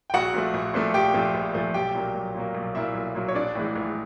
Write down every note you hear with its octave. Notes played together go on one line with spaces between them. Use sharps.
G5
A#1 F#4 F#5
A#2 F3 A3
A#1
A#2 F3 A3
A#1 G4 G5
A#2 F3 A3
A#1
A#2 F3 A3
B1 G4 G5
A#2 F#3 A#3
B1
A#2 F#3 A#3
B1
A#2 F#3 A#3 E4 E5
B1
A#2 F#3 A#3
C#5
A#1 D4 D5
A2 E3 G#3
A#1